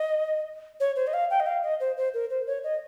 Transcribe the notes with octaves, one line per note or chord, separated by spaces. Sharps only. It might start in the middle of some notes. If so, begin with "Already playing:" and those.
Already playing: D#5
C#5
C5
D#5
F5
G5
D#5
F5
D#5
C5
C5
A#4
C5
C#5
D#5